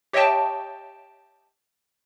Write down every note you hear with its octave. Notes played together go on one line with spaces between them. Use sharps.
G4 C#5 D#5 E5 G5 A5